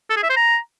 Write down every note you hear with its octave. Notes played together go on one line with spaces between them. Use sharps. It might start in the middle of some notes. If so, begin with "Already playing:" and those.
A4
G#4
E5
C5
A#5